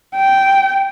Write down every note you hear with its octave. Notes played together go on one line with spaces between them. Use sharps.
G5